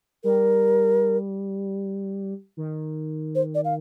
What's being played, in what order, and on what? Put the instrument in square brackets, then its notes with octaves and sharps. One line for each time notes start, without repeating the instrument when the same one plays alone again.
[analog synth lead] G3 [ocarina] A#4
[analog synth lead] D#3
[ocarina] C5
D5
F5